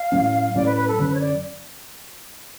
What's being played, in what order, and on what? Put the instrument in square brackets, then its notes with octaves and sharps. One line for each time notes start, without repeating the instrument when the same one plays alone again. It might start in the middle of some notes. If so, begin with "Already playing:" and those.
Already playing: [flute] F5
[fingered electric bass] A2 F#3 C#4
[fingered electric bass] A2 F#3 C#4 [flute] D5
[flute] B4
B4
A4
[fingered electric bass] F#2 D3 F#3 C#4 [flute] B4
[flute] B4
C#5
D5